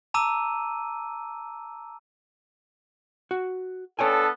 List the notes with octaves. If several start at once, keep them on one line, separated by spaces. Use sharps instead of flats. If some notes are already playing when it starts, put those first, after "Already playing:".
A5 A#5 D6 E6 D#7
F#4
B3 D4 A4 C#5 G5 G#5